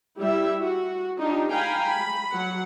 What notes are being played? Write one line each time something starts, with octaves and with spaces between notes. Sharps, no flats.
G3 E4 G4 E5
F#4
D4 D#4 F4 G4
F5 G5 G#5 A#5 B5
B5
F#3 F#5